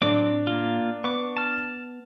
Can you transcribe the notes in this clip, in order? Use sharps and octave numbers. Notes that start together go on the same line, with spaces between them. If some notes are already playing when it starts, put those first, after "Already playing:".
A2 F#3 C4 D4 D6
A#3 F4
B3 C#6 D6
A5 F6